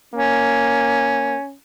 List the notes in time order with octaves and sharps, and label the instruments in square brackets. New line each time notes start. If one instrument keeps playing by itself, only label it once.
[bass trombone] A#3 [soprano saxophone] C#4